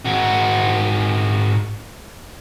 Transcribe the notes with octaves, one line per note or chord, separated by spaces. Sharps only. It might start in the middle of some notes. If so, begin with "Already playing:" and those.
G#2 F#4